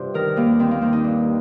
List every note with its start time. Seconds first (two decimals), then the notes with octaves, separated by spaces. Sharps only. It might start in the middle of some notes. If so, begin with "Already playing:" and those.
Already playing: G2 C3 F4 G4 C5
0.14 D#3 A#4
0.36 D#2 A#3
0.59 D#3 C4
0.71 A#3
0.81 D#3 C4
0.93 D#4
1.04 G2